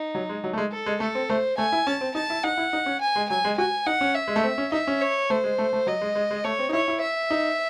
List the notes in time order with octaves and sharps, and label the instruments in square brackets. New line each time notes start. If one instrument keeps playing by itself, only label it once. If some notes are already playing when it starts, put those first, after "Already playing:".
Already playing: [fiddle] D#4
[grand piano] F#3
G#3
F#3
A3
G#3
[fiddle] A4
[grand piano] G#3
[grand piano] A3 [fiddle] A4
[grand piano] C4
[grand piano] A3 [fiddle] C5
[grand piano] A3 [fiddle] G#5
[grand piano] E4
[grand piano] C#4 [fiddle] A5
[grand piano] C4
[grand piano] D#4 [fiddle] A5
[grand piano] E4
[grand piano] D#4 [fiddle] F#5
[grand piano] E4
D#4
C#4
[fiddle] G#5
[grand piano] G#3
[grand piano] F#3 [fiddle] G#5
[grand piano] G#3
[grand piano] F#4 [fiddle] G#5
[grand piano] D#4 [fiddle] F#5
[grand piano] C#4
[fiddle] E5
[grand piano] G#3
A3
C4
C#4
[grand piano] D#4 [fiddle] E5
[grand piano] C#4
[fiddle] C#5
[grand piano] A3 [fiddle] C5
[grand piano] G#3
A3
A3
[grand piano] F#3 [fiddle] D#5
[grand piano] G#3
G#3
G#3
[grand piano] A3 [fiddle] C#5
[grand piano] C4
D#4
[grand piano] E4 [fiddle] C#5
[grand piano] E4
[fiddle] E5
[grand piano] D#4